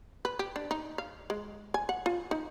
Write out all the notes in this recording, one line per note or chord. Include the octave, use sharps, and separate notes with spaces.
B4
G4
D4
D#4
F5
G#3
G#5
F#5
F4
D#4